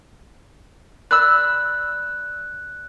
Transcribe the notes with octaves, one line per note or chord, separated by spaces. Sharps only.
D5 B5 E6 F#6